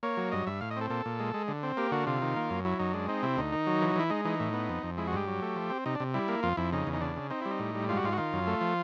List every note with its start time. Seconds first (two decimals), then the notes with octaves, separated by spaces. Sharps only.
0.03 A#3 C#5
0.17 F#3
0.32 G2 D#5
0.47 G2 E5
0.61 A2 F5
0.71 D#5
0.76 C4 A4
0.90 A#2 A4
1.05 A#2
1.19 G#3
1.34 G#3
1.48 D3
1.63 C4
1.77 A#3 G4
1.92 D3 F#4
2.07 C3 F4
2.22 D#3
2.36 A#3
2.50 F#2
2.65 F#3 E4
2.79 F#2 D#4
2.93 G#3 D4
3.08 C4 D#4
3.23 C3 E4
3.37 D2 D#4
3.52 D#3
3.67 F#3
3.82 E3
3.96 E3 E4
4.10 G#3 D#4
4.25 E3 D#4
4.40 A2
4.54 B3
4.69 F2
4.83 F2
4.97 G#3 E4
5.07 F#4
5.13 G2 G4
5.27 F#3
5.42 A3
5.56 F3
5.70 C4
5.86 C3 D#4
5.95 D4
6.00 C3
6.14 G3 E4
6.28 A#3
6.43 F2 F4
6.57 F2 E4
6.73 C#3 D#4
6.87 E2
6.93 D#4
7.01 C#3 D4
7.16 C#3
7.30 C4 D#4
7.41 G3 E4
7.51 D#4
7.59 A2
7.75 G3
7.89 G#2 F4
7.97 F#4
8.04 G#2 F4
8.12 F#4
8.18 D#3 F4
8.33 F#2
8.47 A3
8.61 F3